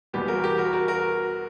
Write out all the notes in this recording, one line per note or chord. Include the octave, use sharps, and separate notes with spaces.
E2 B2 G3 G4
F#4 A#4
G4
F#4 A#4
F#4 A#4
F#4 A#4